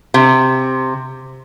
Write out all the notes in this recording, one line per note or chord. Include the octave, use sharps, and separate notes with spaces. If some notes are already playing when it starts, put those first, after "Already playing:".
C3